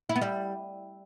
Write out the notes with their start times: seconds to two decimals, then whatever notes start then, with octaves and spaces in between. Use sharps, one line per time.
0.09 E4
0.15 B3
0.22 G3